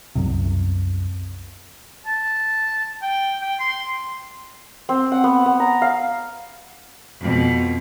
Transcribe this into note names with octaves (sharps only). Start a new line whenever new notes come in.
C2 F#2 C3
A5
G5
G5
C6
C4
F#5
B3
B3
A#5
F5
F2 B2